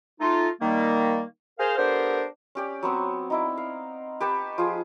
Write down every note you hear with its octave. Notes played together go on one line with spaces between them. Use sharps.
A3 D#4 F4
D#3 G3 A#3
G#4 A#4 C5 F5
B3 D4 G4 A4 A#4 C5
C#4 G4 D5
F#3 B3 C4 C#6
D#4 E4 D5
F5
G4 B4 A5 C#6
F3 F4 G#4